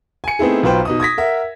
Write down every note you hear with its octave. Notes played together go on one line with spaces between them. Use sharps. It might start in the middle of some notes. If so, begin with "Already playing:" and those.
G#5 C#7
A3 B3 C4 D#4 E4 G#4
B1 F#3 F4 B4 C5 G5
B2 D#4 D#6
D#6 G#6 A#6 B6
A#4 E5 F#5